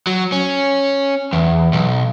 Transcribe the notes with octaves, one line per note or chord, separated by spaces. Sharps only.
F#3
C#4
E2
B1